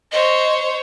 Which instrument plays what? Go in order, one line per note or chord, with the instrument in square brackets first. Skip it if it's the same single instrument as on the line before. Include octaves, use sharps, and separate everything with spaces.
[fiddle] C5 C#5 [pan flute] D#5